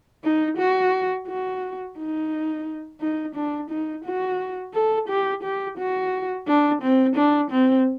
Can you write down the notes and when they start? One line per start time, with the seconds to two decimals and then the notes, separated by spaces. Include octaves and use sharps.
0.24 D#4
0.58 F#4
1.28 F#4
1.97 D#4
3.01 D#4
3.35 D4
3.70 D#4
4.05 F#4
4.74 A4
5.09 G4
5.43 G4
5.78 F#4
6.48 D4
6.82 C4
7.16 D4
7.51 C4